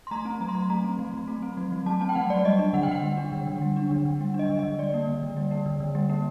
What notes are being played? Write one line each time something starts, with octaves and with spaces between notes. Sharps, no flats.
C6
A3 A#5
C4 A#5
F#3 A#5
C6
F#3 A#5
A3 A#5
C4
F#3
F#3
A3
C4
F#3
F#3
A3 A5
C4 A5
G5
F#3 F#5
F#3 D5
G3 D#5
D4
D3 F#5
G5
D3 F#5
G3
D4
D3
D3
G3
D4
D3
D3
G3
D4
D#5
D3
D#5
D3
G3 D5
A#3
D3
D3
G3
A#3
D3
D3
G3
A#3